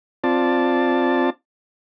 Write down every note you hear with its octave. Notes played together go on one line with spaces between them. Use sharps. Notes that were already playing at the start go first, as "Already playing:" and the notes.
C4 F4 D5 A5